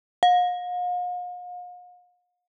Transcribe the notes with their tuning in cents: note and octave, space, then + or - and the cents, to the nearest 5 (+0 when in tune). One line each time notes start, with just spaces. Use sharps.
F5 +45